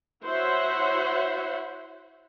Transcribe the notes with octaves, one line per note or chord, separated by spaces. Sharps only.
E4 F#4 C5 C#5 E5 F#5